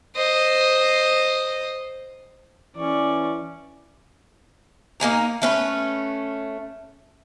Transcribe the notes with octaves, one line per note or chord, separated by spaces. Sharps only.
C5 D#5
E3 C#4 D5 C#6
A#3 D#4 G#5 A#5
A3 C#4 B4